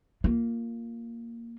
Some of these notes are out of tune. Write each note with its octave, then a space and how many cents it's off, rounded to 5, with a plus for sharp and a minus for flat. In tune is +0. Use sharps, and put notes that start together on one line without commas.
A#3 -5 F4 +0